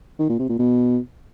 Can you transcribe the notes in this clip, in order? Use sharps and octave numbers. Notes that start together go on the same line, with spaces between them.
D#3
A#2
C3
A#2
B2